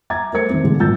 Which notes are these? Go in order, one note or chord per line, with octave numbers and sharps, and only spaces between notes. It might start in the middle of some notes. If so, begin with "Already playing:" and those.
E5 A#5 D6 G#6 A6
A3 A#4 C5 E5 G#6 C#7
D#3 C4
A1 D3 G#3
G#1 A#2 E6 G6 A6